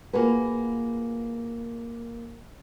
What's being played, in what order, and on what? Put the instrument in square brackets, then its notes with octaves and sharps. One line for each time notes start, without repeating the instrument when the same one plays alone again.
[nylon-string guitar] A#3 F4 F#4 G#4 B4